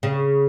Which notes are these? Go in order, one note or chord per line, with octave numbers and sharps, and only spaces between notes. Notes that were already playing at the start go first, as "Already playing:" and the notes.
C#3